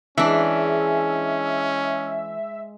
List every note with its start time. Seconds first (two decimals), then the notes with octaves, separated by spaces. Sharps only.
0.18 E3 G#3 C#4 D4 G#4 E5